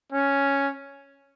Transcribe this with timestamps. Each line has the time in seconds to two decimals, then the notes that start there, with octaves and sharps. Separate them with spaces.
0.13 C#4